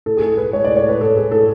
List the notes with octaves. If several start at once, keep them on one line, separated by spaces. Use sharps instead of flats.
A2 A4
G#4
A2 A4
A2 B4
G#3 C#5
A2 D5
C#5
A2 B4
A2 A4
A2 G#4
A2 A4